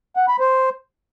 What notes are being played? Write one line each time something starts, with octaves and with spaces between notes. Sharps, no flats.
F#5
B5
C5